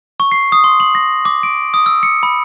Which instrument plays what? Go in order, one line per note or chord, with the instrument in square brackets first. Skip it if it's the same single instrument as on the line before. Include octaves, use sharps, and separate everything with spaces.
[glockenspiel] C#6
C7
D#6
C6
F#7
A#6
D6
D7
D#6
E6
C#7
B5